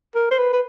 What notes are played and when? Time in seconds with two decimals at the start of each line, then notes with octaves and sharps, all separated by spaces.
0.15 A#4
0.31 C5
0.38 B4
0.53 B4